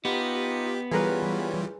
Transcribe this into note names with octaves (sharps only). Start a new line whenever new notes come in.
B3 D#4 F4 G4
E3 G3 C#4 F4 G#4 A#4 B4